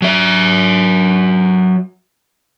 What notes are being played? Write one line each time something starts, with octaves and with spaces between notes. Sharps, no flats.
F#3 E5